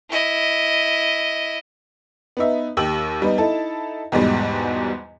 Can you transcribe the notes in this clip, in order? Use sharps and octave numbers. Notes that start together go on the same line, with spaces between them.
E4 D#5
B3 D#4 E5
D#2 G4 E6 F#7
G3 B3 D#4
D#4 E4 A4 A5
E2 G#2 B2 G3 G#3